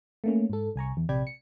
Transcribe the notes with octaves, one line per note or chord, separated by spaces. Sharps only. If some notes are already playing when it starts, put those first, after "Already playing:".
A3 A#3 C#4
G#2 A4
C2 G#5 A#5 C#6
E2
A#1 C3 D5 G5 B5 G#6
C#7